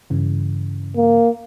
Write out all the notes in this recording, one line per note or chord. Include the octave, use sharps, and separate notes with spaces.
G2 C#3 E3
A#3